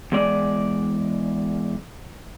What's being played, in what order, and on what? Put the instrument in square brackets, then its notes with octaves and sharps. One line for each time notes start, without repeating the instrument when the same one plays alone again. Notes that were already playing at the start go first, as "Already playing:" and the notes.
[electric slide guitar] E2 G#3 D5